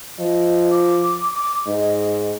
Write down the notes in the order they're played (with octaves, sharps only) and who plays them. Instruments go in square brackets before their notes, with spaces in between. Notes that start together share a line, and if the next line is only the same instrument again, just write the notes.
[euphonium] F3 [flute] D#5
[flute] D6
D6
[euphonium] G#2 [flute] D#5